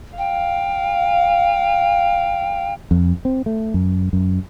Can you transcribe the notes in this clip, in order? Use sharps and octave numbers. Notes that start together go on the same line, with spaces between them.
F5 G5
F2
C4
A3
F#2
F#2